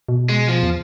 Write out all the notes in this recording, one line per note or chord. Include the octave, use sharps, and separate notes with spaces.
B2
G#3
F3
E2